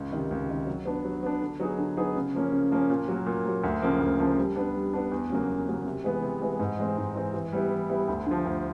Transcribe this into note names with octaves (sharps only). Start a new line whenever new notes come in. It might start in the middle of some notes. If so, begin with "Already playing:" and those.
Already playing: C#2
C3 D#3
C#2
C3 D#3
F#3
B3 D4
F#3
B3 D4
D3
F#3 B3 D#4 G#4
D3
F#3 B3 D#4 G#4
C#3
F3 A#3 C#4
C#3
F3 A#3 C#4
A#2
F#3 A#3
A#2
F#3 A#3
D2
C#3 F3 A#3
D2
C#3 F3 A#3
G3
B3 D4
G3
B3 D4
E2
C#3 F#3 A#3
E2
C#3 F#3 A#3
C3
E3 G#3 B3
C3
E3 G#3 B3
G#2
E3 G#3 C4
G#2
E3 G#3 C4
E3
G3 B3 E4
E3
G3 B3 E4
D2
D3 F3
D2